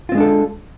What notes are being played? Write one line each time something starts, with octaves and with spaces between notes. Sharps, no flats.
G#3 C4 D4 F4 A4